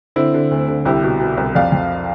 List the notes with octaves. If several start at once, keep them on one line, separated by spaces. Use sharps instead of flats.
D3 C4 E4
D3
D2
D3
C2 E4 G4
B2
B2
C2
F2 D5 F5
F2